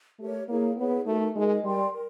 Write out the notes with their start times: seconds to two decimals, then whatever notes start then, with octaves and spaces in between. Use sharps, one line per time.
0.19 A3 G4 A#4 C#5
0.48 A#3 E4 G#4 C#5
0.77 B3 E4 G#4 C#5
1.06 A3 D#4 F#4 A#4
1.36 G#3 D#4 F#4 A#4
1.64 G3 A#4 D5 G5 C6
1.93 A#4